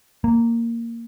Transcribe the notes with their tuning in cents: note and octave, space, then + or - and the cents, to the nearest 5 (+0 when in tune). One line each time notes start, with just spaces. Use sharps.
A#3 -10